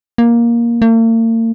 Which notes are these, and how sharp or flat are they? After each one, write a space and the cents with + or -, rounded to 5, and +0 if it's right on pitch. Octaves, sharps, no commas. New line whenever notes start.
A#3 +10
A#3 -45